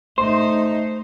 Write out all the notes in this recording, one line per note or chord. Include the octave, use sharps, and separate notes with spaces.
A3 D#4 C5